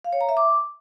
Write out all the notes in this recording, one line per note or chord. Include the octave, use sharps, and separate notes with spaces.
F5
C#5
A#5
E5
D6